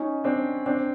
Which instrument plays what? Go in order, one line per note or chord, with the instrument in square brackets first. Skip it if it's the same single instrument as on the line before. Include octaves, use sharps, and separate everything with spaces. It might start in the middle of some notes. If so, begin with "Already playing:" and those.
Already playing: [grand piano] C#4 D#4
C4 D4
C4 D4